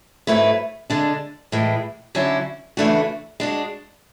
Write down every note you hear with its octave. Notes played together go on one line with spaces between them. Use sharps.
G#2 F#3 A3 E4 B4
D3 G#3 D4
A2 E3 G#3
D3 F#3 C#4 E4
C#3 E3 A3 D4 F#4
G#3 D4 F#4